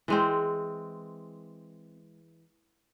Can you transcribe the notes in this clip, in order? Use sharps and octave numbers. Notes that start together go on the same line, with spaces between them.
E3 G#3 C4